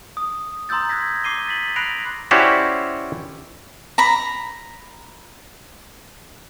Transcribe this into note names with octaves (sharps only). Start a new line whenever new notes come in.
D#6
A#5 C6 D#6 E6 G6 A6
F#6 G#6 A#6 B6
D6 C7 D#7 G7
A6 B6 F#7
B5 F#6 A#6 C7 D7 F7
C#4 E4 F#4 G4 C5 D5
A#5 B5